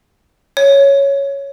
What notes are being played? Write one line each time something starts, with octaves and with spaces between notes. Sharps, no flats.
C#5